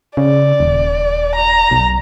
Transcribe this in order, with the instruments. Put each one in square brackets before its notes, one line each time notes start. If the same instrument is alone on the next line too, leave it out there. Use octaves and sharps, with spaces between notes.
[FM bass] C#3 [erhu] D5
[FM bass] D#1
[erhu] A#5
[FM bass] B1